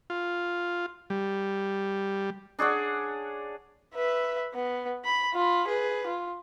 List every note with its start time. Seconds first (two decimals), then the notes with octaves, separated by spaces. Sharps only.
0.10 F4
1.10 G3
2.59 D4 G#4 C#5 F#5
3.95 B4 E5
4.53 B3
5.05 B5
5.34 F4 B5
5.67 G#4 B4
6.07 F4